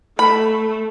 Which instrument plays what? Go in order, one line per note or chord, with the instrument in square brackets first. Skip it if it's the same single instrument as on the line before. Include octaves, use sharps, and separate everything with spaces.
[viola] A3 [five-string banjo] B5